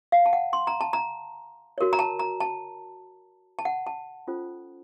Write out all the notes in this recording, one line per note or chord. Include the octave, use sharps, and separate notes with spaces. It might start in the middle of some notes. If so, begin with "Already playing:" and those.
F5
A5
F#5
C6
A#5
A5
A#5
F#4 A#4 C#5
A#5
A5
A#5
A5
A5
F#5
A5
C#4 F4 A4 C5